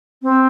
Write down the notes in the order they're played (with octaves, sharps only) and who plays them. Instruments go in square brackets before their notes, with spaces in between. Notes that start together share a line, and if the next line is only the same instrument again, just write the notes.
[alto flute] C4